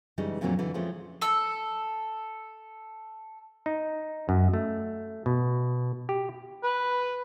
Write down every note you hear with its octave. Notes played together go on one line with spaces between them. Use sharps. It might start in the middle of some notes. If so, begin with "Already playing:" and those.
C#3 E3 G3 G#3 D#4
F2 A#2 D3 F#3 C4 C#4
D3 E3
F3 G#3 A3 C4 C#4
A4 E6
D#4
F#2
A3
B2
G4
B4